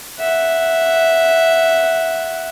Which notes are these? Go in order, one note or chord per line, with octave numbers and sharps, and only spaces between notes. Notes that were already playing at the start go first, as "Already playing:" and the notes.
E5 F#5